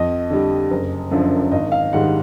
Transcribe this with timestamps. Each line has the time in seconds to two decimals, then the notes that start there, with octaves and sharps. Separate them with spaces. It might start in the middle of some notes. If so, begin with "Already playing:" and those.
Already playing: F2 D#5
0.30 D3 G3
0.71 F#1
1.11 F#2 D3 F3
1.51 G#1 D#5
1.72 F5
1.93 G#2 D#3 G3 F#5